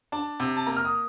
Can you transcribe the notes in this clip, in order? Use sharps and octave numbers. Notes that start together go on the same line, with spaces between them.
D4 A5
C3
A5
A#3 A#5
F6
D#6